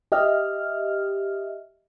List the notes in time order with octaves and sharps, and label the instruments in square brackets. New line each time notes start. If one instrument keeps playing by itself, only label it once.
[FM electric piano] G4 D#5 E5 F6